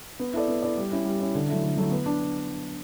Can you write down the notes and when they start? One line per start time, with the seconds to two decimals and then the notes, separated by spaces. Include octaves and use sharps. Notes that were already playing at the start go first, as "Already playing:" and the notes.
0.20 B3
0.34 E4 A4 D5
0.48 B3
0.62 E4 A4 D5
0.77 G3
0.91 C#4 E4
1.05 G3
1.20 C#4 E4
1.35 D3
1.48 F#3 A3 E4
1.63 D3
1.77 F#3 A3 E4
1.91 B3
2.06 D4